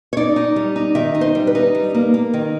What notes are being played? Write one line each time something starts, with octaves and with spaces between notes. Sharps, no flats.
C#5
D#4 D5
D#4
G3
D#4
D#3 E5
D#4
C5
G3
B4
D#4
G3
A#3
A#3
D#3